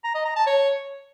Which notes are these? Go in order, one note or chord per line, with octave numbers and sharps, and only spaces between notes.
A#5
D#5
A#5
A5
C#5